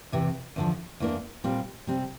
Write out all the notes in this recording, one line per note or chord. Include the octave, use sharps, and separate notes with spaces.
E2 C3 E3
E2 D3 F3
E2 E3 A#3 D4
A#2 G3 C4
C3 G3 C4